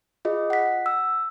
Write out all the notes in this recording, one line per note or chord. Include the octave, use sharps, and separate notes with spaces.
F4 G#4 D#5
F#5 B6
E6